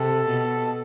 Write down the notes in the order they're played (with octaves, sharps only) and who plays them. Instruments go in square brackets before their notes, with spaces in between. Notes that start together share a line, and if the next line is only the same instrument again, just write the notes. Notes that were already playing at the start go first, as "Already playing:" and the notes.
Already playing: [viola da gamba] C3 [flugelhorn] A4
[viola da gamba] B2